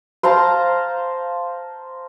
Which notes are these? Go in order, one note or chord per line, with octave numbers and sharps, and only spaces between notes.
C5 F5 A5 A#5